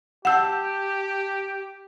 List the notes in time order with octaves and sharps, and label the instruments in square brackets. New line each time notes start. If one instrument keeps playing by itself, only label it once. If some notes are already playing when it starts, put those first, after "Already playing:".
[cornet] G4 [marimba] F#5 E6 [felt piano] A5 G6 E7